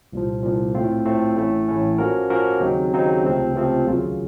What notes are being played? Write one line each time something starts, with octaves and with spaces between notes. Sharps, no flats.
C2 A#2 F3
C2 A#2 F3
A2 A3 C4 F4
A2 A3 C4 F4
A1 A2 A3 C#4
A1 A2 A3 C#4
F3 A#3 C#4 F#4 A#4
F3 A#3 C#4 F#4 A#4
D#2 C#3 F#3 C4 D#4
D#2 C#3 F#3 C4 D#4
C#2 C3 F3 A3 C4
C#2 C3 F3 A3 C4
D#2 C#3 F#3 A#3 F4